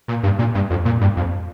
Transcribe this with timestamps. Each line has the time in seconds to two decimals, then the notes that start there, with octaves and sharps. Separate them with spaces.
0.08 A#2
0.23 G2
0.39 A#2
0.55 G2
0.70 F2
0.85 A#2
1.01 G2
1.17 F2